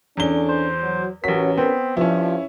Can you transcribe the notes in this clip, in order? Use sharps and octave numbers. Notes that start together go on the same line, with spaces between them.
E2 C#4 D4 A4 G7
C5
F#3
A1 F#3 C#4 A#4 B4 B6
B3 C4
G2 F3 C#4 E4